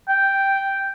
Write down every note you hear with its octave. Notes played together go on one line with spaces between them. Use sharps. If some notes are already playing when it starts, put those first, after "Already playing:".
G5